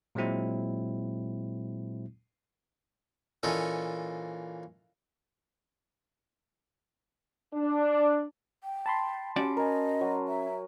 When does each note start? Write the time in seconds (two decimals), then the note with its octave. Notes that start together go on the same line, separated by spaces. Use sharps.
0.15 A#2 F#3 G#3 C4 E4
3.43 A#2 E3 C#4 A4 D#5 C#6
7.54 D4
8.64 G5
8.86 A5 B5 C6
9.36 C#4 F#4 G4 D5
9.57 A#4 D#5 G#5
10.01 F#3
10.27 E5